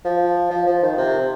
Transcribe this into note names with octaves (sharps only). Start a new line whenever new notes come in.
F3
F3
F3
D#3
C3